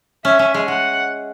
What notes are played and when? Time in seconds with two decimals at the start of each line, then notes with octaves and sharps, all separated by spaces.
0.25 C#4 E5
0.39 C#4
0.54 G#3
0.68 G#3 F#5